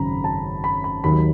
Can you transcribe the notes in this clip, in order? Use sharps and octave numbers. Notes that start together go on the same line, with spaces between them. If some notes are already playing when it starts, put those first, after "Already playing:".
Already playing: G#1 F#2 C#3 F#3 A#5 B5
A5
B5
B5
D#2 D#3 F#3 B5